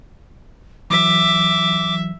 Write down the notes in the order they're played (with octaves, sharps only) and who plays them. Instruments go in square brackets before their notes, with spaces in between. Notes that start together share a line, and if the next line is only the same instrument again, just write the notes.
[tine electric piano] E3 F#3 B6 [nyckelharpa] E5 [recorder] D6